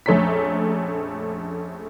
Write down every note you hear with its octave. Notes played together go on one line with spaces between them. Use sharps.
A#1 F2 A3 C#4 A#5 B6